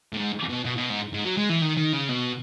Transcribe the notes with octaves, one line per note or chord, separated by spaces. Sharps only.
A2
G#2
B2
B2
B2
G#2
G#2
F#3
G#3
E3
D#3
D#3
C#3
B2